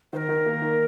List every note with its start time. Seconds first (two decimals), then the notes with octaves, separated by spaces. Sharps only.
0.13 D#3 C5
0.17 A#4
0.29 D#3
0.46 A#3
0.62 D#3